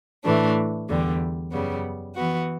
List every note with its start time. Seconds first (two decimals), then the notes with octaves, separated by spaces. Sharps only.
0.24 A2 E3 A3 D4
0.89 E2 D3 G3
1.52 F#2 C#3 G3 B3
2.16 E3 B3 F#4